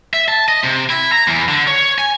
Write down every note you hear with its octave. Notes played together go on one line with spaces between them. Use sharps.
E5
A5
D#5
C3
E4
A#5
E2
D3
C#5
G#5